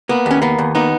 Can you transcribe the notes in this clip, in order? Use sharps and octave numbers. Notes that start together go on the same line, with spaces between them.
A#3 B3
D#2 C#4
A#3 B3
D#2
A#3 B3 D#4